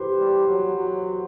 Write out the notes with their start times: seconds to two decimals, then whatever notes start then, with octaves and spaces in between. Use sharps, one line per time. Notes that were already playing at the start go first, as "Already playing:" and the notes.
Already playing: G4 B4 C5
0.19 G3
0.48 F#3
0.76 F#3